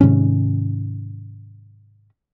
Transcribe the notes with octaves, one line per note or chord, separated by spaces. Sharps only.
G#2 C3 D#3 C#4